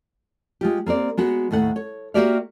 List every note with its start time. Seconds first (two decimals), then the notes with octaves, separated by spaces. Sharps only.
0.61 G#3 F4 G4
0.86 A#3 C4 A#4 D5
1.17 G#3 B3 F#4
1.51 D#2 A2 A3 F#5
1.76 C#5
2.14 A#3 F#4 G4 D5 E5 F5